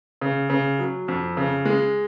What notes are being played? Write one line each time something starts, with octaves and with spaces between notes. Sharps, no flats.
C#3
C#3
F#3
F2
C#3
G#3